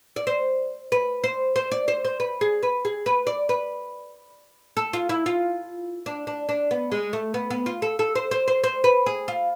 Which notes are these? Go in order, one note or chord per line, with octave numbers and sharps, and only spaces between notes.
D5
C5
B4
C5
C5
D5
C5
C5
B4
G#4
B4
G#4
B4
D5
B4
A4
F4
E4
F4
D4
D4
D4
B3
G#3
A3
B3
B3
F4
A4
A4
C5
C5
C5
C5
B4
G#4
F4